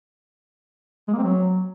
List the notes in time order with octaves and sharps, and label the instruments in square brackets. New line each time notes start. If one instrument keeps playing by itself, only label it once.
[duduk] G#3
A#3
C4
F#3